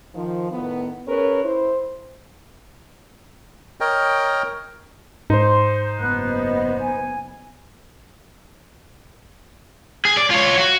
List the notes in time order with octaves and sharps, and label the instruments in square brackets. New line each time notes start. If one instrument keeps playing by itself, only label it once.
[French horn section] D#3 F3
A2 D#3 B3
C#4 G#4 A#4 B4 C#5
E4 C5
[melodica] A#4 C#5 D#5 G5
[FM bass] G#2 [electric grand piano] D#4 C5 [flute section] C6
[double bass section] F#1 B3 [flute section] F#6
[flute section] D#5
G#5
[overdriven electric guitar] G#4
D5
F4 C#5
F#4